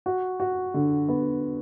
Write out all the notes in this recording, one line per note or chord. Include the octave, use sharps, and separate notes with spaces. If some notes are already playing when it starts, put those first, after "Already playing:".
F#4
F#4
D3
B3